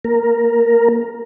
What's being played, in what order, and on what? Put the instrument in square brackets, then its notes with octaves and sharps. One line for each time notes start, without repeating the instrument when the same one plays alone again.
[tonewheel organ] A#3 A#4